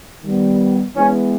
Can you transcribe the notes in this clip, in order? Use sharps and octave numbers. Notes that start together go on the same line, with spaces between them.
D#3 G3 B3
E3 G#3 B3 C#4